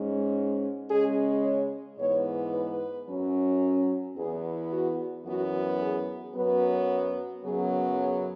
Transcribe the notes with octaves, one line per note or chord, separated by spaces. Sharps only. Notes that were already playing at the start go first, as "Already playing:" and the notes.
Already playing: G#2 G#3 C#4
C#3 G#3 C#4 G#4
C#5
G#2 E3 B3 C#5
B4
F#2 F#3 C#4
E2 E3 B3 G#4
F#4
F#2 E3 B3 F#4
G#4
F#2 F#3 B3 B4
F#2 C#3 F#3 B3 G#4
G#4